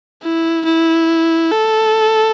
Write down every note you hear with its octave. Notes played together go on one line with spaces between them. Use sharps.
E4
E4
A4